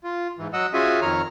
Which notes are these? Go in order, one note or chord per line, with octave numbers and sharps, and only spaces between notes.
F4
G#2 E3
F#3 D#5 F#5 E6
C#4 F4 F#4 G#4 E5 G#5
F2 D#3 C#5 A#5 F6